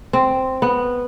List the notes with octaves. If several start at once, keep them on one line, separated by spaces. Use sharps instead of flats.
C4
B3